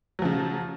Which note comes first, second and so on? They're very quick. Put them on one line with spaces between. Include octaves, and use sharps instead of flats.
F#3 F3 C#3